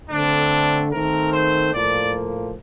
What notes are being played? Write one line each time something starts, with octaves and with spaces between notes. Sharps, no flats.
D3 A3 C4 D4
D#3 A3 C4 A#4
C5
A2 F3 A#3 D5